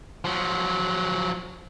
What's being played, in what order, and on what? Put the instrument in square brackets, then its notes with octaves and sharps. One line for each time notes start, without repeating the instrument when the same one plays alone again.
[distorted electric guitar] F3 F#3